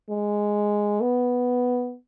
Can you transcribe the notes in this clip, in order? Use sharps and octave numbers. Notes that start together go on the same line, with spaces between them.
G#3
B3